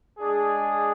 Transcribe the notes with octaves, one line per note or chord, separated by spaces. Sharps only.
G#3 D4 G#4